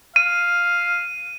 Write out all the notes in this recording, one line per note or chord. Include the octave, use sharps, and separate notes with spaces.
F5 D#7